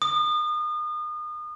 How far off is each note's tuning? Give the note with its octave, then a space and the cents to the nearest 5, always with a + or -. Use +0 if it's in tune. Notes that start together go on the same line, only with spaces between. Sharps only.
D#6 -35